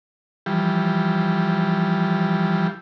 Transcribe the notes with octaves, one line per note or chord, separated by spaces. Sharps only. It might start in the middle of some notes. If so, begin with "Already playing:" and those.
E3 F3 G3